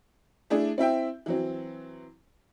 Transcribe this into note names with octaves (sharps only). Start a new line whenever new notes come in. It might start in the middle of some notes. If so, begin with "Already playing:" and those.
A3 D4 E4 G#4
C4 E4 E5 G5
E3 F#3 C4